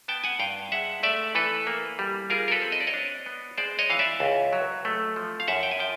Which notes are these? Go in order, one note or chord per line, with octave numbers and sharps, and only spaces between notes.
B3 G5 A5
F#5 G#5
G2 F5 G5
G#3 E5 F#5
A3 D5 E5
E3 A4 B4
A#3
G3
F4 G#4 A#4
A#4
A4 B4
C4
D#5
D5
C#5 D#5
D4
B3
G#3 C5 D5
C#5 D#5
E3 F5
D5 E5
C#2
F#3
A3
F3
F5
F#2 E5 F#5
G5
G#5
F3 G5 A5